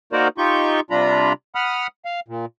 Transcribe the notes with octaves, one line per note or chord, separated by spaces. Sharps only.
A#3 D#4 F#4 A#4 C5 D5
D#4 F4 G4 C#6 G6
C3 G3 D4 F4 A#5 B5
F#5 B5 D#6 F6
F5
A#2